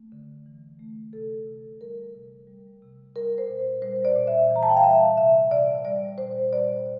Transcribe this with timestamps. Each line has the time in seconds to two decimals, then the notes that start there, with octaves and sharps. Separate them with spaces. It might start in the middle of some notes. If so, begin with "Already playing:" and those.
Already playing: A3
0.12 D3
0.46 E3
0.80 A3
1.13 C3 A4
1.47 C3
1.81 G3 A#4
2.15 C3
2.47 G3
2.82 C3
3.16 G3 A#4
3.38 C5
3.49 A#2
3.82 G3 C5
4.05 D5
4.16 A#2
4.27 E5
4.50 E3
4.56 A#5
4.63 A5
4.69 G5
4.77 F5
4.83 G3 E5
5.17 C3 E5
5.51 C3 D5
5.85 G3 D5
6.18 A#2 C5
6.52 G3 D5